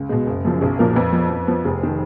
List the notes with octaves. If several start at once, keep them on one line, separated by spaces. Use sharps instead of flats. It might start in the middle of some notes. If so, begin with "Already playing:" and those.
Already playing: C#2
B2 G#3
F#1
F#2 C#3 F3
B1 G#4
A#2 F3 A#4
F2 B4
F3 B3
F2
F3 B3
F1 G#4
D#3